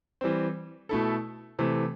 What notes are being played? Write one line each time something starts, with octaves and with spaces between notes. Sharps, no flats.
E3 G3 C4
B2 A3 E4 A4
C3 E3 A3